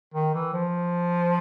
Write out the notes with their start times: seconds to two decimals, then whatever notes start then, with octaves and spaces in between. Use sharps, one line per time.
0.14 D#3
0.34 E3
0.54 F3